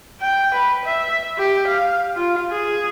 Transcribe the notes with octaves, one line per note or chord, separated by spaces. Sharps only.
G5
B4
E5
G4
F5
F4
G#4